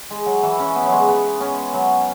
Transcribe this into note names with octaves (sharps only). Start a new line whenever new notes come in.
G#3
F#3
E3
C#4
B3
F#3
G#3
B3
C#4
F#3